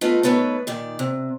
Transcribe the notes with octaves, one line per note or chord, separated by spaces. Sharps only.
A3 B3 F4 D#5
D#3 A3 B3 B4 C#5
A#2 D#3 D5
C3